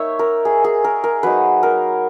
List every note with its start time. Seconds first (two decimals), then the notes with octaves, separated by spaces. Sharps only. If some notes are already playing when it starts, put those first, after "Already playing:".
Already playing: A#3 D#4 C#5 E5
0.19 A#4
0.45 G#4
0.64 G#4
0.84 A#4
1.04 A#4
1.23 F#3 A#3 D#4 B4
1.63 A#4